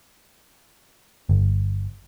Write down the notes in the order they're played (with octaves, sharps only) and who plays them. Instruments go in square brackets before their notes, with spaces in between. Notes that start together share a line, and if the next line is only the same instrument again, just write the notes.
[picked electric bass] G1